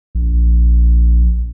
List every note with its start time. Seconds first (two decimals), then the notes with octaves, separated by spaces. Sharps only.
0.15 A#1